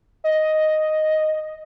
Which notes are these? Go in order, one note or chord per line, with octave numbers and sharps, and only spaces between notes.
D#5